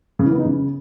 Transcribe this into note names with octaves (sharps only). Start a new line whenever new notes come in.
C#3
E3
B3
D#4
C#3